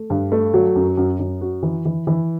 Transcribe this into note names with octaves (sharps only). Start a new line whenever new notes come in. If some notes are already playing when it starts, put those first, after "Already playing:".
Already playing: A3
G2
A3
F#3
F#2
F#2
F#2
F#4
E3
E3
E3